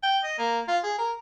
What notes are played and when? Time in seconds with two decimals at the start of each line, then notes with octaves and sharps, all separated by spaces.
0.03 G5
0.24 D#5
0.38 A#3
0.68 F4
0.84 G#4
0.98 A#4